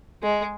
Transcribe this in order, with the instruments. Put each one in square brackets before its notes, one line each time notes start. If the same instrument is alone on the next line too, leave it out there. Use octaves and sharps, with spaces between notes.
[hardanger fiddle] G#3